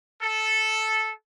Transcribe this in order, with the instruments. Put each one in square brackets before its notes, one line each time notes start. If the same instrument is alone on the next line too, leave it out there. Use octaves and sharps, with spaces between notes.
[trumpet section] A4